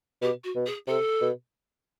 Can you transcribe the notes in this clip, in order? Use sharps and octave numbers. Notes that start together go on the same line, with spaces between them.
B2 G4
F#4
B2
G#4
C3 A4
B2